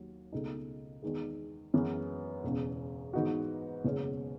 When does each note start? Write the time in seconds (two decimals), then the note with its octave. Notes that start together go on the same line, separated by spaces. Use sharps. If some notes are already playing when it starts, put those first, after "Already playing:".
Already playing: D#2 F#3
0.32 C#2 B2 A3 D#4 G#4
1.02 E2 D#3 G#3
1.74 F#2 E3 G#3 B3
2.44 E1 E2 C#3
3.13 G#2 E3 B3 D#4 F#4
3.84 F#1 E2 B2 G#3 C#4